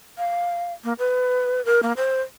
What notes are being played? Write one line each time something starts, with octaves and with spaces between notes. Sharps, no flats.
F5
A#3
B4
A#4
A#3
C5